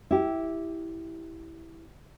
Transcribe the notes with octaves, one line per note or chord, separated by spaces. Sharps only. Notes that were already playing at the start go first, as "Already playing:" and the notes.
E4 G4